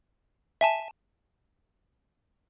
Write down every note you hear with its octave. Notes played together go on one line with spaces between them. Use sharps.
E5 G#5 A5